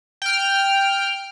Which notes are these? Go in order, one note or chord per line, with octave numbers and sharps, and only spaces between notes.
G5 F6